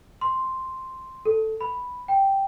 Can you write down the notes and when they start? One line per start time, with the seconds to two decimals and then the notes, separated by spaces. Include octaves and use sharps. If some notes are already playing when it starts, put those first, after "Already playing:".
0.21 C6
1.25 A4
1.61 B5
2.08 G5